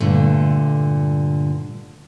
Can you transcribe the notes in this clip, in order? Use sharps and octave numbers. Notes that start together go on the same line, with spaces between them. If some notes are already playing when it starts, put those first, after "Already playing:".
G2 A#2 D3 A3